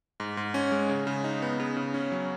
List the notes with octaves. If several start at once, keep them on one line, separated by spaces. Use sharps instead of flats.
G#2
G#2
C#4
G#3
C#3
C#3
D#4
B3
C#3
C#3
C#4
F#3